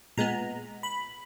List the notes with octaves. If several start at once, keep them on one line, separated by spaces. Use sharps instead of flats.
A#2 G#3 B3 A#5
B5